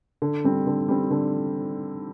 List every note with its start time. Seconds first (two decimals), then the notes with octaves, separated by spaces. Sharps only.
0.22 D3
0.44 G3 C4
0.67 D3
0.88 G3 C4
1.11 D3